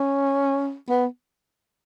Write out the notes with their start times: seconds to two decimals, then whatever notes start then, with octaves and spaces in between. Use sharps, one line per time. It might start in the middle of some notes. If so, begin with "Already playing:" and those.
Already playing: C#4
0.89 B3